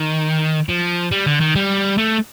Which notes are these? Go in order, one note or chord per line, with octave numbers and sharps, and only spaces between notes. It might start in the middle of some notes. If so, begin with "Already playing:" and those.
Already playing: D#3
F3
G3
D3
D#3
G3
A3